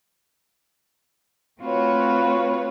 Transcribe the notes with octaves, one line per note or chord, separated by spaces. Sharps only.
A3 C4 F4 F#4 B4 C#5